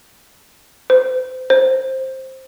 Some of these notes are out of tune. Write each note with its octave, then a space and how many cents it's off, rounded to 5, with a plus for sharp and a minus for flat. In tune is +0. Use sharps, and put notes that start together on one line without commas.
C5 -30
C5 +10